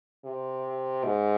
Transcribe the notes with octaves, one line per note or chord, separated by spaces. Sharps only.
C3
G#2